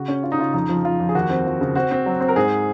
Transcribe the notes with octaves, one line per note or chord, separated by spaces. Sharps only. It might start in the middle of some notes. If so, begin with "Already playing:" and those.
Already playing: C#3 F#4
C#4
C#4 F4
D#4
C#3 F4
F2 D#4
F3
F3 F4
F2
G#4
D#2 F#4
C4
F3
C#3
C4 F#4
C4
F#3
C4
A#4
G#2 G#4